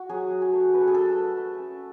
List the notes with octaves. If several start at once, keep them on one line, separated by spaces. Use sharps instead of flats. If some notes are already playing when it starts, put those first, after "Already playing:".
Already playing: F#4
F#3 G#4
F#3
G#4
A3
C#4 B4
A4
G#4
A3 A4
A3
A3
C#4